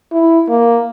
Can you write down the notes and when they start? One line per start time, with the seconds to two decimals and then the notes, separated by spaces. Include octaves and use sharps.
0.12 E4
0.49 A#3